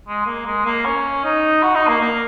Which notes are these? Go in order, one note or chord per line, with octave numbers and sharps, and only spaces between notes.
G#3
A#3
G#3
A#3
C#4
D#4
F#4
D#4
A#3
A#3